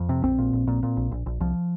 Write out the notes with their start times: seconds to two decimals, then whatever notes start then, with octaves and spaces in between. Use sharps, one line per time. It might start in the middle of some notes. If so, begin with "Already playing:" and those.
Already playing: F2
0.09 C3
0.23 A#1 C4
0.38 A#2
0.53 A#1
0.67 A#2
0.83 A#2
0.97 A#1
1.11 A#1
1.26 A#1
1.40 C2 F3